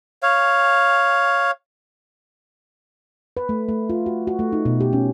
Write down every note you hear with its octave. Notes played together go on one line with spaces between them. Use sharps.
C#5 F5
B4
A3
A3
F4
F#4
F#4
A3
D#4
B2
G4
C#4